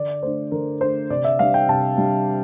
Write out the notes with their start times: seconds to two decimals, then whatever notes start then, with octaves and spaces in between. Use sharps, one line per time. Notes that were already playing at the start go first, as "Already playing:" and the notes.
Already playing: D3 D5
0.22 A3 D4 C5
0.52 D3 A#4
0.81 A3 D4 C5
1.10 C3 D5
1.25 E5
1.39 G3 D4 F5
1.54 G5
1.69 C3 A5
1.98 G3 D4